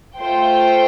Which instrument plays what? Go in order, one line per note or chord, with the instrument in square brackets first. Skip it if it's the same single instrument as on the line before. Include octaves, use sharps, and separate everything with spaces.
[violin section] A3 F4 C5 G5